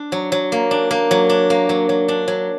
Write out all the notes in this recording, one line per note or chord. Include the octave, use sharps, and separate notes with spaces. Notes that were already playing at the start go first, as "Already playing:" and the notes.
Already playing: D4
F#3
F#3
A#3
D4
A#3
F#3
D4
A#3
F#3
F#3
D4
F#3